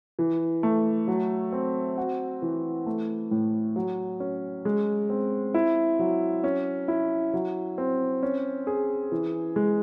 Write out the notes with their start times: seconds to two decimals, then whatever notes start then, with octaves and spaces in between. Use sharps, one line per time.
0.19 E3
0.63 A3
1.08 F#3
1.53 C4
1.97 F#4
2.42 E3
2.86 A3
3.31 A2
3.76 F#3
4.20 C#4
4.65 G#3
5.10 C4
5.54 E4
5.99 F#3
6.44 C#4
6.88 E4
7.34 F#3
7.78 C4
8.23 C#4
8.67 G#4
9.12 E3
9.56 G#3